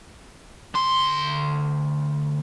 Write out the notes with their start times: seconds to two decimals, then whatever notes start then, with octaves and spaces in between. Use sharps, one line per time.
0.75 D2 C6